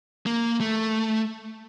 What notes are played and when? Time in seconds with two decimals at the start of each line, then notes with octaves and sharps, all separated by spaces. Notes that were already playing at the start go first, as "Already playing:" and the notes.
0.26 A#3
0.60 A3